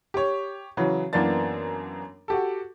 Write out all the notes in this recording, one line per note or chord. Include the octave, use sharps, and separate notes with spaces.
G4 C#5
C#3 E3 F#3
F#2 E3 A#3 B3 D4 A6
F#4 G4 A4